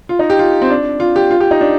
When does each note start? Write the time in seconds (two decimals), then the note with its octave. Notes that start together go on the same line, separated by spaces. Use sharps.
0.09 F4
0.19 D#4
0.30 G4
0.39 F4
0.62 C4
0.70 D4
1.00 F4
1.16 G4
1.31 F4
1.40 G4
1.51 D#4
1.61 D4